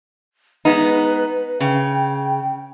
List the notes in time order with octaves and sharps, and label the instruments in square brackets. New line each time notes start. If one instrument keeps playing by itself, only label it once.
[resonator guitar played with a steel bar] G#3 B3 D#4 [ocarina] B4
[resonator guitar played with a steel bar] C#3 [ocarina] G5